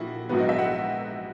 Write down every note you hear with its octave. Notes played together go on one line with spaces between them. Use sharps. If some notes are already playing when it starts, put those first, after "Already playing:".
Already playing: A#1 A#2 E4 F#4
A#1 G#2 F#3 B3 F#4
D#5
E5
F#5